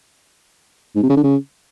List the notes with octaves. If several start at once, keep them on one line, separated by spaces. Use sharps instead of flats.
G#2
C3
C#3
D3
C#3